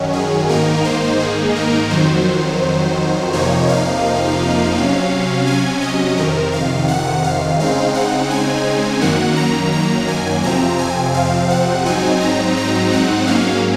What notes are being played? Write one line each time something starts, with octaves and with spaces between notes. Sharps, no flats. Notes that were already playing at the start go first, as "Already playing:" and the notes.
Already playing: F#2 D#3 F#3 C#4
G#4
G#2 D#3 A#3 D#4 A#4
C5
G#4
A#4
F2 D#3 F#3 C5
F2 C3 F3 A#3 D#4 C#5
F5
C3 F#3 C#4
G#5
D#5
F2 C3 D#3 A#4
F5
F#5
F5
C#3 G#3 C4 D#4 F5
F#5
G#5
F#2 D#3 F#3 A#3 F#5
A#5
A#5
G#5
F2 C3 F3 C4 A#5
G#5
F5
F#5
G#2 F#3 C4 D#4 G#5
A#5
A#5
F#5
G#2 F#3 A#3 C#4 F5